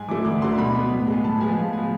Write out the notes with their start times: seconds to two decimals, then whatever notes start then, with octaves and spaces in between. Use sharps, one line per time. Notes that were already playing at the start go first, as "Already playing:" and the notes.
Already playing: G#2 G#5
0.08 E3 A3 D6
0.25 D2 D6
0.41 D3 A3 C6
0.58 B2 B5
0.75 B3
0.91 A2
1.07 G#3 B3
1.24 A2 A5
1.40 F3 G#3 B3 G#5
1.56 A2 F5
1.73 F3 B3 G#5